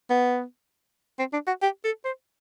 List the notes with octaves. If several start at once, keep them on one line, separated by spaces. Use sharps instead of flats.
B3
C4
D4
F#4
G4
A4
C5